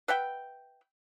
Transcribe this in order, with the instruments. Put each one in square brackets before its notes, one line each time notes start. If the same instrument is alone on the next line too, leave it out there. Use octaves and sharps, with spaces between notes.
[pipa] B4 E5 F#5 G5